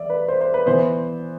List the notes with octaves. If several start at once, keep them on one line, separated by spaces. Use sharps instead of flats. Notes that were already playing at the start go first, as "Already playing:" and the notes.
Already playing: E2 D5 E5
B4
C5
C5
B4
E3 B3 C5